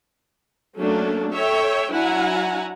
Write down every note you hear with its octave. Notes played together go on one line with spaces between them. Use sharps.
F#3 A3 A#3 C#4 D4
A4 C#5 E5 G5
F#3 D4 E4 F#5 G#5 A#5